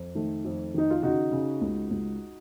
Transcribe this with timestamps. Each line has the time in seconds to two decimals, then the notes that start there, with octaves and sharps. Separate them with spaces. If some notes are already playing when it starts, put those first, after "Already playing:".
Already playing: F2
0.15 D#3 A3
0.45 F2
0.74 D#3 D#4
0.90 F4
1.03 C#3 D#4 F#4
1.32 C#3
1.61 C#2
1.91 C#2